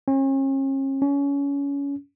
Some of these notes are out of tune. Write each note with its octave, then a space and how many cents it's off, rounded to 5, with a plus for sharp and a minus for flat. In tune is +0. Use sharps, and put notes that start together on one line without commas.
C#4 -40
C#4 +25